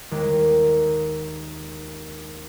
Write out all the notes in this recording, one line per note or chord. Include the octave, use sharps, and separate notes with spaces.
D#2 D#3 G#3 A#3